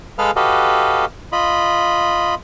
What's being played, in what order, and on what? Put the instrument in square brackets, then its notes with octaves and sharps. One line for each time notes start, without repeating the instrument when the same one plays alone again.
[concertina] G#3 G#4 A4 B4 F5 F6
F#4 G4 A4 B4 D#5 F5
F4 D#5 B5